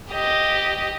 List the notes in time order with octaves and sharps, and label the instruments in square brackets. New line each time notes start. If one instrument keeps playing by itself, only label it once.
[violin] G4 D#5